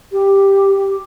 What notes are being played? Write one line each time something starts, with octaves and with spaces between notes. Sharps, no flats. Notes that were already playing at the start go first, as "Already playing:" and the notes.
G4